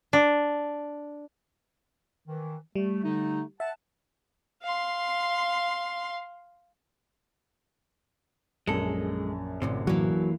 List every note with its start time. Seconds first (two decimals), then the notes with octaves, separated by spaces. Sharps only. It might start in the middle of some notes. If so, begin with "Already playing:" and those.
0.13 D4
2.27 D#3 E3
2.75 G3 A3
3.04 D3 A3 D#4
3.60 E5 F#5 A5
4.62 F5 C6
8.67 A#1 F#2 G#3 A4
9.62 D2 A2 C3
9.87 E3 F#3 A#3